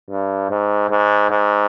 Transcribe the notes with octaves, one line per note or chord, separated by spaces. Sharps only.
G2
G#2
G#2
G#2